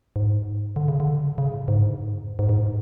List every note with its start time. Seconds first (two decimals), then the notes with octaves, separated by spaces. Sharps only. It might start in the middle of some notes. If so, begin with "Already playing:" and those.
0.16 G#2
0.76 D3
0.88 C#3
1.00 D3
1.38 C#3
1.53 A2
1.68 G#2
1.83 G2
1.99 G#2
2.08 A2
2.19 F2
2.39 G#2
2.49 G#2